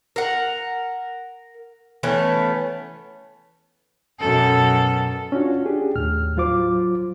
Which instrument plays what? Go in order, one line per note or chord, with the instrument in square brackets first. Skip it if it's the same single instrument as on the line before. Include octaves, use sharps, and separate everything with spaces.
[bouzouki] A#4 F#5
E3 A3 B3 C#4
[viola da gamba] F#2 B2 A4
[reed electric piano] C#4 D4 F4 F#4
D4 G4 G#4
D#2 A2 F6
F#3 F4 C5 D6